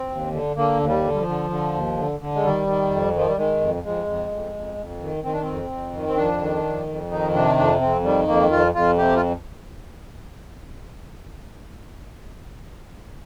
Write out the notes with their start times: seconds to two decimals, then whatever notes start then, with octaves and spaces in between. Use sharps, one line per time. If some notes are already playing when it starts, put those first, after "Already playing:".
Already playing: C4
0.10 D#2
0.33 D3
0.56 D3 A#3
0.80 D#2
0.88 G3
1.04 D3
1.13 G3
1.19 F3
1.27 D3
1.50 D3
1.74 D#2
1.97 D3
2.20 D3
2.35 G#3
2.43 D#3 G3
2.67 D#3
2.90 F2
3.14 D#3 F3
3.26 G3
3.37 D#3 G#3
3.60 F2
3.83 F2 G#3
4.07 F2
4.31 F2
4.54 F2
4.77 F2
5.01 D#3
5.23 D#3 C4
5.33 D4
5.42 C4
5.48 F2
5.70 F2
5.94 D#3
6.07 C4
6.17 F2 D4
6.41 D#3
6.64 F2
6.88 F2
7.11 D#3 D#4
7.34 C3 D4
7.57 F2 D4
7.81 F2 C4
8.04 D#3 G3
8.27 F2 A#3
8.51 F2 F4
8.74 F2 F4
8.97 C3 G4
9.16 F4